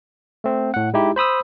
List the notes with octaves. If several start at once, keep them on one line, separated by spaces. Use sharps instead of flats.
A3 C4
A2 F#5
G#3 D#4 E4 G4
C5 B5 D#6 E6